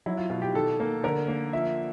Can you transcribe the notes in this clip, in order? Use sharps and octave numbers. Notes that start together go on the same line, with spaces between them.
F#3 E4
F4
B2 F4
G4
D#3 A4
A#3
D3 A#4
A#3
F3 E5